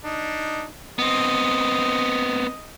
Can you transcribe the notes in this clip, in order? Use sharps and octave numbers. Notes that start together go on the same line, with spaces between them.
D4 D#4
B3 C4 D#5